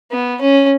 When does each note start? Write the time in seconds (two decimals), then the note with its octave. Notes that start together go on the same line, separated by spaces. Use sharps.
0.12 B3
0.41 C#4